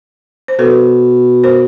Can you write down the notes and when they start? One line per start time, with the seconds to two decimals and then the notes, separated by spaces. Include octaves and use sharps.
0.48 C5
0.59 B2 A4 B4
1.44 A#4 C5